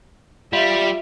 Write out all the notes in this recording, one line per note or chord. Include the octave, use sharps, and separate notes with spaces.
G3 F4 E5